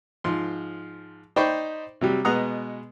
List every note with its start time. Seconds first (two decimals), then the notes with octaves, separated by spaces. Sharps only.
0.24 G#2 F3 C6
1.36 D#4 C5 D5 G5 B5 C#6
2.01 C3 F#3 G3
2.25 B2 G#3 B3 F#5 A#5 D#6